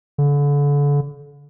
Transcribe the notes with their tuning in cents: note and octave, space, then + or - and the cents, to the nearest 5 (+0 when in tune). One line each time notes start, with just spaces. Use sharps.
D3 -35